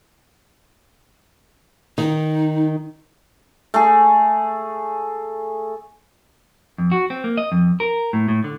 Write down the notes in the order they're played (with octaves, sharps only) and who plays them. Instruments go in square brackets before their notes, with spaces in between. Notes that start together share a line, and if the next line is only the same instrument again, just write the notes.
[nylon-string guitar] D#3 [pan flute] D#4
[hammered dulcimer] A3 G#4
[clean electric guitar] F2
F#4
C4
A#3
D#5
F2
A#4
A2
A2
D3